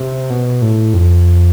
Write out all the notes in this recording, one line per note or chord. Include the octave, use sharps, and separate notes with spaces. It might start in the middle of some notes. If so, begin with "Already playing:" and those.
Already playing: C3
B2
A2
F2